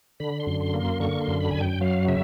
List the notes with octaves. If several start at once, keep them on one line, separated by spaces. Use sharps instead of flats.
D3 B5
C6
F#2
C6
A#3
C6
D3 C#6
C6
F#2
B5
F#2 G#5
G5
F#3 F5
C#3 E5